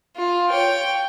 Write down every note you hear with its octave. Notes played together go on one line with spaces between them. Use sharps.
F4
C#5 G5